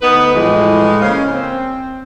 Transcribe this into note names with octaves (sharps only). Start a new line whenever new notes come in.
D2 B3 D#4 B4
A2 E3 F3 G#3
C#3 A#3 C#4 C5 F5
C4